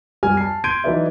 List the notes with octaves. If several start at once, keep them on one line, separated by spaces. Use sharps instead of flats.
F#2 F#3 G3 G#5 F6
A5 C7
C6 G6 G#6 D7 D#7
E3 F#3 D#4 B4 D5 E5